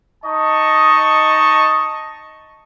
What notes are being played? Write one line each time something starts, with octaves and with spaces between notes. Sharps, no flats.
D#4 D#5 A5 C#6